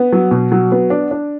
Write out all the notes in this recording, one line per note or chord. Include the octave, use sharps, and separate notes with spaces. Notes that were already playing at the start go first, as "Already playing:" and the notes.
Already playing: B3
F#3
B2
F#3
B3
D4
D4